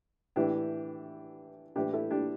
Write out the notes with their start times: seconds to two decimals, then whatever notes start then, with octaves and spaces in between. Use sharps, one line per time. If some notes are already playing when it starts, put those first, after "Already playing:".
0.36 A2 E3 D4 G4
1.76 A2 E3 D4 G4
1.93 E4 A4
2.11 D4 G4